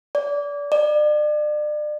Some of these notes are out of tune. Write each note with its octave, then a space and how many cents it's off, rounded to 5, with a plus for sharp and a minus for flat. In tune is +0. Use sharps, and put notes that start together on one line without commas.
D5 -30
D5 +35